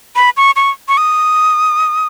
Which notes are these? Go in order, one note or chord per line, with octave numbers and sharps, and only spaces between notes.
B5
C#6
C#6
C#6
D#6